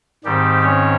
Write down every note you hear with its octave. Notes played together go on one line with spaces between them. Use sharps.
G#2 D#3 G3 C4 G4
C#4 C#5